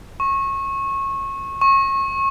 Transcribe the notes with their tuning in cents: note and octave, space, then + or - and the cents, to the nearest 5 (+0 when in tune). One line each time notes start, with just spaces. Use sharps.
C#6 -25
C#6 -30